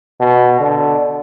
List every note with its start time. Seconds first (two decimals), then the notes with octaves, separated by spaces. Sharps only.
0.20 B2
0.60 D3